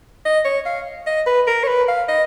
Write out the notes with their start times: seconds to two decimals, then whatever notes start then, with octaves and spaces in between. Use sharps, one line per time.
0.25 D#5
0.45 C#5
0.66 F5
1.07 D#5
1.26 B4
1.48 A#4
1.63 C#5
1.68 B4
1.88 F5
2.09 D#5